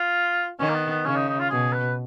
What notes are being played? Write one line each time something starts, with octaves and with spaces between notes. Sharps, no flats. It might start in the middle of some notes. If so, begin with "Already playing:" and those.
Already playing: F4
D#3 C#4
A#3
B3
B3
C#3 C#4
D#4
D#4
F4
B2 G#4
B4